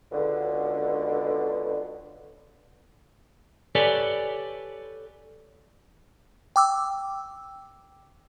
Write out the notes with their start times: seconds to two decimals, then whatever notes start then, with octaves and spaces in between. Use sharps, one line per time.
0.12 C#2 B2 D3
3.75 G4 A4 B4 C#5 D5 G#5
6.56 G5 D6 E6